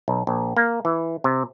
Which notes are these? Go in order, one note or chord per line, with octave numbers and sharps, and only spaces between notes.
B1
A#1
A#3
E3
C3